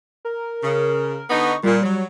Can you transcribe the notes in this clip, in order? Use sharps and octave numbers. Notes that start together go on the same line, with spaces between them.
A#4
C#3
D3 B3 D#4 C#6
A#2 G3
F#3